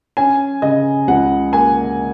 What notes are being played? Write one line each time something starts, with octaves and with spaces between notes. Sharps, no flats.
C#4 G#5
C#3 D#5
C#2 F#5
A#3 G#5